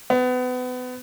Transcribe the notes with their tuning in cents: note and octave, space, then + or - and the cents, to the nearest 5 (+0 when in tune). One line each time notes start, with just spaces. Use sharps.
B3 +30